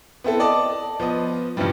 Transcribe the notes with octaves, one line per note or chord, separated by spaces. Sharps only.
B3 C4 E4 A4
D5 D#5 A5
F3 B3 D#5
G2 C#3 E3 F3 G3